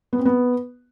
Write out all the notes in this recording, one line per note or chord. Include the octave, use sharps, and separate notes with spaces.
B3
C4
B3